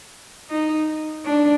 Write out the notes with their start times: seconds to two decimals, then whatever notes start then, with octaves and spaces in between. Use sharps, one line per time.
0.50 D#4
1.25 D4